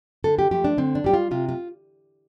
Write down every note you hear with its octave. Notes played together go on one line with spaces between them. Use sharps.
D3 A4
G4
F3 A3 G4
D4
D3 C4
D4
G3 G4
F4
C3 F4
F4